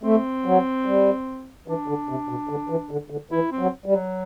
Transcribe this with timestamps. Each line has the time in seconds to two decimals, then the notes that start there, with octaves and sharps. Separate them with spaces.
0.03 A3 C4
0.46 F#3
0.86 G3
1.68 E3 D4
1.88 D3
2.09 C3
2.29 B2
2.49 D3
2.69 E3
2.91 D3
3.10 D3
3.31 E3 E4
3.51 C4
3.59 F#3
3.86 G3
3.93 F#3